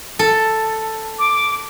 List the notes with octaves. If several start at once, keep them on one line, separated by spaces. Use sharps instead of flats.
A4
D6